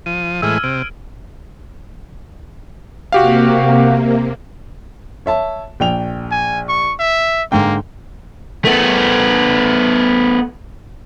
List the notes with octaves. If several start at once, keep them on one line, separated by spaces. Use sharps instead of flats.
F3 D#7
A2 E3 G#3 E6 F6 G#6
C3 D7
C3 A#3 F#4 G4 F5
C#5 E5 A5
A#1 G5 F7
G#5
C#6
E5
G#2 D3 A#3 G5
A3 B3